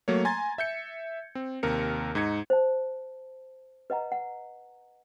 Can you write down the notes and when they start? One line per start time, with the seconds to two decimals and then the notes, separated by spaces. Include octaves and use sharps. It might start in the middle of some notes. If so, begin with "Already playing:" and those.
0.08 F#3 A3 A#3 C#5
0.25 G#5 A#5 C6 G#6 A6
0.58 E5 G6 C#7
1.35 C4
1.63 D#2 C3 A#4 C#7
2.15 G#2 D#4 G#6 C#7
2.50 C5 A5
3.90 B4 D#5 F#5 A#5
4.12 F#5